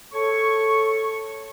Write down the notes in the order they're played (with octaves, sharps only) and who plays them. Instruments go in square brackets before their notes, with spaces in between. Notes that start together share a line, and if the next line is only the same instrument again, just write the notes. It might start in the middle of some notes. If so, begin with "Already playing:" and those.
[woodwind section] A4 C#5 C#6